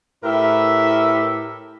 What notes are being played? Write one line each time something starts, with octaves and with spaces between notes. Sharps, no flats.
A2 E4 G4 A#4 B4 E5